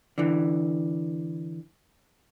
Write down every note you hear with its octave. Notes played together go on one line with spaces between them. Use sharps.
D3 E3